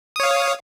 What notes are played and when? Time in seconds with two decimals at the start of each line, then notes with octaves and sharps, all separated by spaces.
0.16 D#6
0.20 C#5
0.23 F5